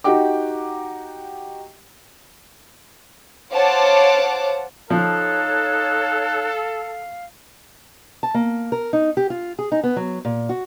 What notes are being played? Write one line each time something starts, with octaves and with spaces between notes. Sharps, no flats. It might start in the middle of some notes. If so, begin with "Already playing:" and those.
D#4 F#4 G4 F#5 G5 D6
C5 C#5 F5 F#5 A5 D6
F3 D#4 A4 C#5 F5 F#6
A5
A#3
A#4
D#4
G4
F4
G#4
D#4
B3
F#3
A#2
F#4